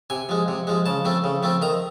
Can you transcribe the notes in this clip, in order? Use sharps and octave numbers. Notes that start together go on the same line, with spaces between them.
C3 G#5
F3 G#3
C3
F3 G#3
C#3 A5
F3 A3 C4
C#3
F3 A3 C4
D#3 A#5